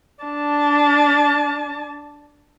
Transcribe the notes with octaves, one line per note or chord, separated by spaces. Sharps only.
D4 A5